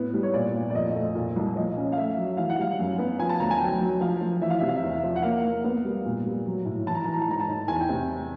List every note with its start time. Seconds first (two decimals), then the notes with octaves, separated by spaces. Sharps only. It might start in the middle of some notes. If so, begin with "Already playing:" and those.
Already playing: A2 B3
0.14 G3
0.23 C#5
0.34 A#2 D5
0.54 A#2
0.70 D5
0.74 F2 D#5
0.95 A3
1.15 A#2
1.36 C2
1.56 F3 D#5
1.77 C#4
1.92 F5
1.98 A3 E5
2.17 F#3
2.37 E3 F5
2.50 F#5
2.58 G3 F5
2.79 F#2
2.99 B3
3.19 F3 G#5
3.29 A5
3.40 D2 A#5
3.51 G#5
3.60 F#3 G5
3.81 F#3
4.01 F3 F5
4.21 F3
4.41 E3 E5
4.50 F5
4.59 C3 E5
4.68 F5
4.76 E5
4.83 E2
5.04 F3
5.16 F#5
5.23 A#3 F5
5.44 A#3
5.64 B3
5.85 G3
6.05 A#2
6.26 G3
6.46 F#3
6.66 A2
6.87 E3 A5
6.95 A#5
7.04 E3 A5
7.14 A#5
7.22 A5
7.28 G#2 A#5
7.40 A5
7.48 D#3
7.68 E2 G#5
7.80 G5
7.89 C3